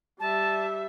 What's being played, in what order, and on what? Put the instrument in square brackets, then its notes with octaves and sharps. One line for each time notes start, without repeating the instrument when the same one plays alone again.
[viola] G3 E5 [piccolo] A5